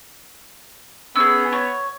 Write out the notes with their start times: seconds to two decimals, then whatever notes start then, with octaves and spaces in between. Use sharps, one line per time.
1.16 B3 C#4 G#4 E6
1.52 C#5